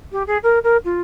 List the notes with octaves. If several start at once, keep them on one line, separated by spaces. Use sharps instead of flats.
G4
G#4
A#4
A#4
F4